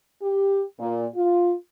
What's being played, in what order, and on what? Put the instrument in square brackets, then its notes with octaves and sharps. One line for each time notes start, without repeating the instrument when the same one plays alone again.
[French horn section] G4
A#2
F4